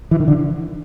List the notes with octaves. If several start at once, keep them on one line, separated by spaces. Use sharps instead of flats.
E3
D#3
D3